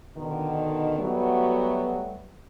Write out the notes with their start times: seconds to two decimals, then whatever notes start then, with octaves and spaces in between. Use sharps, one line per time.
0.17 B2 D3 D#3
0.99 F#3 G3 A3 B3 F#4